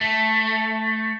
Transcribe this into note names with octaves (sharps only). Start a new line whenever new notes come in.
A3